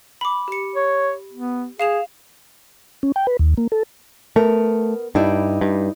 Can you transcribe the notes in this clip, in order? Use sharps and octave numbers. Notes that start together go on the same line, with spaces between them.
B5 D6
G4 C#7
C#5
B3
G#4 F5 E7 F7
C#4
G5
B4
D#2
A#3
A4
A3 B3 A#4
G2 D#4 E4 D5
G2